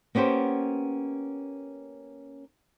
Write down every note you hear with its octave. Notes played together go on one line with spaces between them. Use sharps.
A#3 B3 C#4 G4 C5